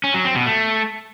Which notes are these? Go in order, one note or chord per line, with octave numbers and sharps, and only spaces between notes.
C#4
F#3
C4
B2
A3